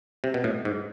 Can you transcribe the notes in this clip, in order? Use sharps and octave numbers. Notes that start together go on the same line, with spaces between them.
C3
B2
A2
G#2